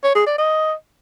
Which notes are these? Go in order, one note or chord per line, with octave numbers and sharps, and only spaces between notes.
C#5
G#4
D5
D#5